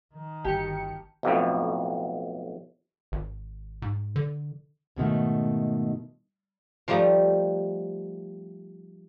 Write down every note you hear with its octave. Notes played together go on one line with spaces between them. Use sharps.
D#3
G1 G4 A5 C#7
B1 F2 A2
G#1
G#2
D3
G#2 B2 D#3 A3
F3 G3 A3 D#4